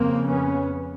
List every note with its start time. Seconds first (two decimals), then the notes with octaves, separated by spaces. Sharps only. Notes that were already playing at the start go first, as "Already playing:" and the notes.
Already playing: F2 C#3 A#3 C4
0.27 B3 C#4